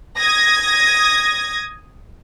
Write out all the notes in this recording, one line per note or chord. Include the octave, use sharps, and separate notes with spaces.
D#6 G#6 A#6